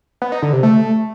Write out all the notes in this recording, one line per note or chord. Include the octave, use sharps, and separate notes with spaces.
B3
D#4
D3
C3
A3